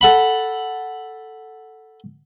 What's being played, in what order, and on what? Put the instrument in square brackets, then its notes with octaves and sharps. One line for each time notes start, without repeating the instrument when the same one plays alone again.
[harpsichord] A4 F#5 B5